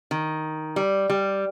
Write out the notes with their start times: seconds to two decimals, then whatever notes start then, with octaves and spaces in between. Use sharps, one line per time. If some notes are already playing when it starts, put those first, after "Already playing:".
0.11 D#3
0.76 G3
1.10 G3